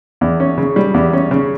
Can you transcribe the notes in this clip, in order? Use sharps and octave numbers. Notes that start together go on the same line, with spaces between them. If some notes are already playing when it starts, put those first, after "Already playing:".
E2
C#4
C#3
G3
E2
C#4
C#3